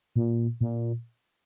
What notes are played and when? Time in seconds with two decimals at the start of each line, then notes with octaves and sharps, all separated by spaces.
0.16 A#2
0.61 A#2